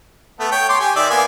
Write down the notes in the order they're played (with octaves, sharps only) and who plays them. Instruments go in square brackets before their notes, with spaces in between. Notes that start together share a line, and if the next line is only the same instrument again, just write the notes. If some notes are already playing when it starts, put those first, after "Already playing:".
[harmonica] A3 B3 A4
C#5 G5
C6 D6
G4 G#5
D#3 D5 E5
A#3 B3 G#5